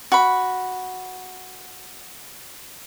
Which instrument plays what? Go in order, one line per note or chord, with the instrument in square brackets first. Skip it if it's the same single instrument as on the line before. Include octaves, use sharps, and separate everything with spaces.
[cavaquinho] F#4 B5